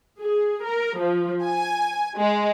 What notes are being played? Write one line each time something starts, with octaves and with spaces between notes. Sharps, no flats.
G#4
A#4
F3
G#5
G#3